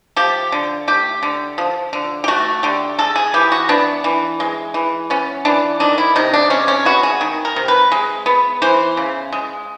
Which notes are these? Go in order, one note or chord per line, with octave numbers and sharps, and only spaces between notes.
F3 G4
D3
A3 G4
D3
F3
D3
G4
A3 F#4
D3 G4
G#3 A4
G#4
E3 G4
F#4
B3 D4
E3
G#3
E3
B3 C#4
E3 D4
D#3 D4
E4
C3 D#4
D4
G#3 C#4
C#4
B3 F#4
G#4
D#3
A#4
C3
B4
G#3
B3
E3 C5
C#3
G#3